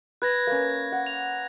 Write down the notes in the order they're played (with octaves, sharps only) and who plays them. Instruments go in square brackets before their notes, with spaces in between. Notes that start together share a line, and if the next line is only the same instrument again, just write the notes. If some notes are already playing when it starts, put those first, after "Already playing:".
[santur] B4 [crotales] F#6 G#6 A#6
[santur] A#3 C#4
F#5
[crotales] F7